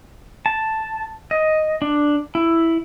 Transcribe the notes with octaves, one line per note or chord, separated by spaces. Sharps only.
A5
D#5
D4
E4